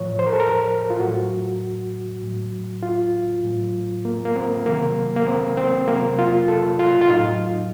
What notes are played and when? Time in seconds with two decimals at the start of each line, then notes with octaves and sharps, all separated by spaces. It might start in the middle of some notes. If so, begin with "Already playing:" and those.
Already playing: A2 F3 C#5
0.19 C5
0.27 A#4
0.33 A4
0.40 A#4
0.90 F4
1.00 A2 F#3 F#4
2.23 A2 F#3
2.83 F4
3.44 A2 F#3
4.05 A#3
4.25 A#3
4.36 C4
4.66 C3 D#3 F#3 A#3
5.17 A#3
5.27 C4
5.57 C4
5.88 C3 F#3 A#3
6.19 F4
6.48 A4
6.79 F4
7.02 F4
7.09 A2 F#3 D#4